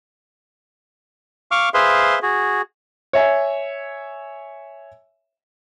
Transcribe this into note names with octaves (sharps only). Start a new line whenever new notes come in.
F5 C#6 D6 F6
G#4 B4 C5 E5 F5 C6
F#4 G#4
C#5 E5 G#5